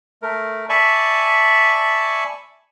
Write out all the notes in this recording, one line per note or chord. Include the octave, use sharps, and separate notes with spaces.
A3 A#4
D5 E5 G#5 A5 B5 C#6